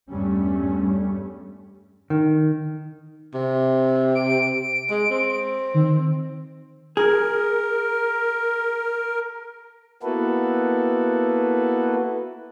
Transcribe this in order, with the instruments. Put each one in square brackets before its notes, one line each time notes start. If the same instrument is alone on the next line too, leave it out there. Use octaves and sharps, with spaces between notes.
[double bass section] E2 G2 G3 A3 C#4
[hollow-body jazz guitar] D#3
[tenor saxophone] C3
[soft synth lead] D7
[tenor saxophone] G#3
C4
[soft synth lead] D#3
[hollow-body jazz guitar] G#4 [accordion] A#4
[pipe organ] A#3 B3 E4 F#4 A4 B4